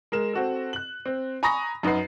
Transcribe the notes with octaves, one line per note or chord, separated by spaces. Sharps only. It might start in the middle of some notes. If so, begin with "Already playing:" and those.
G#3 A#4 E7
C4 F#4 A4
F#6 F#7
C4
G#5 A#5 B5 C#6 D#6 A#6
F#2 D#4 F#4 B4 C7